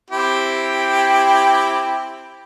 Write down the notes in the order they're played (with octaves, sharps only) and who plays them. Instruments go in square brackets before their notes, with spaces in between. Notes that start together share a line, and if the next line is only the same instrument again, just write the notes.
[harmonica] C4 E4 G4